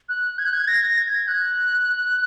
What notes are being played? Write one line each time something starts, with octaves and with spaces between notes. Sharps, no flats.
F#6
G#6
F#6
G#6
A#6
G#6
F#6